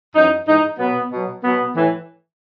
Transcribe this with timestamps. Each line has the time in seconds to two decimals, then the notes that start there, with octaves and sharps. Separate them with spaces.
0.15 F#2 E3 D#4
0.46 G#2 E3 D#4
0.78 B2 F#3 B3
1.11 B2 F#3
1.43 B2 F#3 B3
1.74 A2 E3